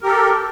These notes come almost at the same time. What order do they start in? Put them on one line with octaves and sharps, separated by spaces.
A#4 G4 A4